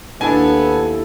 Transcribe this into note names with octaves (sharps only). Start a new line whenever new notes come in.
D#2 B3 D4 E4 A4 G#5